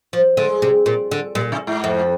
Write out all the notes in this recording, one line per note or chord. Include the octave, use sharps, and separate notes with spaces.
F3
D3 G#3
C3
A#2
D3
A#2 G3
C3
G#2
F2